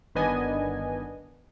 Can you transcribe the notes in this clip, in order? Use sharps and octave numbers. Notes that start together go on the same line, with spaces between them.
G1 D#3 B3 D4 D#5 G#5